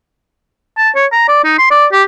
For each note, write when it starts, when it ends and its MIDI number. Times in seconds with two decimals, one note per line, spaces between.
0.77 0.90 81
0.96 1.06 73
1.13 1.28 82
1.28 1.44 74
1.44 1.57 63
1.59 1.68 84
1.71 1.86 74
1.93 2.03 67